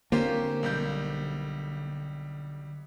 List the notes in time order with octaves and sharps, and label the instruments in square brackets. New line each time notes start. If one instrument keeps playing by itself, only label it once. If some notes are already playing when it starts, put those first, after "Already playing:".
[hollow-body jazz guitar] D3 C4 F4 [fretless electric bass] A#3 [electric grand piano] C#4 G4 C5
[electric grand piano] B1 G3 G6